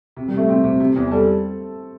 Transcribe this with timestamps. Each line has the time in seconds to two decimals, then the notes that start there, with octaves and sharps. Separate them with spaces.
0.17 C3
0.28 G3
0.33 C3 A3
0.48 C3 C4
0.64 C3
0.80 C3
0.96 E2
1.11 G3 A4